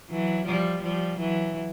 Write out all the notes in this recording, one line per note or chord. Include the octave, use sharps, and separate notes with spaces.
E3 F#3
F3 G3
F3 G3
E3 F#3